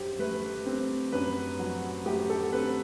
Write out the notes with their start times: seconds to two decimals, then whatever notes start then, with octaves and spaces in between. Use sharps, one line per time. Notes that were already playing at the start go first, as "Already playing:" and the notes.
Already playing: F#2 F#3 G4 C5
0.19 A3 B4
0.66 C4
1.12 F#2 B4
1.59 F#3
2.06 A3 G4
2.30 A4
2.52 C4 B4